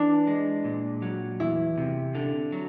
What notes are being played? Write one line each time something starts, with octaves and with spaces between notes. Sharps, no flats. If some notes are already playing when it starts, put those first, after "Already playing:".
Already playing: E3 D4
G#3
A#2
F#3
E2 E4
C3
D3
F#3